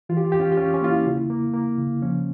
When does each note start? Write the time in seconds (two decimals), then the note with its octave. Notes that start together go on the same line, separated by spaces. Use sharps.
0.09 E3 F4
0.17 G4
0.25 F4
0.32 E2 G4
0.40 C#4 F4
0.52 G4
0.57 E2 C#4 F4
0.74 C#4
0.81 A#3 F4
0.90 E4
1.06 C#3
1.30 A#3
1.54 A#3
1.78 C#3
2.02 F3 C#4